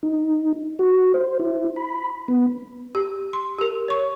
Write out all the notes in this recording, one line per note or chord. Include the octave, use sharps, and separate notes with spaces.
D#4
F#4
C5
E4
B5
B3
G4
C6
G4 A#4
C#5 C#6